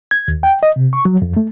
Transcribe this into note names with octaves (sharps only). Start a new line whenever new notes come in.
G#6
D#2
G5
D#5
C3
C#6
F#3
F2
A3